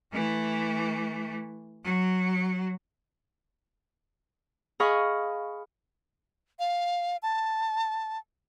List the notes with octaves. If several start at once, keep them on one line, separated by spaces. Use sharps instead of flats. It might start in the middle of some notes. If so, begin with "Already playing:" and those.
E3 A3
F#3
G#4 D#5 F5 B5 C#6
F5
A5